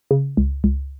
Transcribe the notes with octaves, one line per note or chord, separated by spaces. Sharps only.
C#3
C#2
C#2